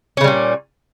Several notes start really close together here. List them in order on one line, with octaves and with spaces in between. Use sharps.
C#4 C#3 G3 A#2